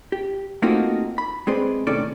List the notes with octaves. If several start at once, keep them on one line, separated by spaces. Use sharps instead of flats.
G4
A3 A#3 C4 D#4 F4 F#4
B5
G#3 C4 G#4 B4 C5 D5
A2 C3 D#3 C#4 A4 D5